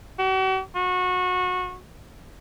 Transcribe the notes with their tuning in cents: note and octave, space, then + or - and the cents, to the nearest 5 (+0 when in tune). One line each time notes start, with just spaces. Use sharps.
F#4 +45
F#4 -25